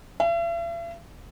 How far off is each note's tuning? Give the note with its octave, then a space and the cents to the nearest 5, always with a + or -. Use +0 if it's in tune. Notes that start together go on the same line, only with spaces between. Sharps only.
E5 +45